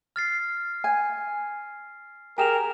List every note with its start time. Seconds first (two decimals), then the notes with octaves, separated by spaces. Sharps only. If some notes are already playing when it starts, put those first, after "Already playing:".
0.16 F6 A6 C7
0.84 G#5
2.38 G4 G#4 A#4 G5 G#5 E7 F7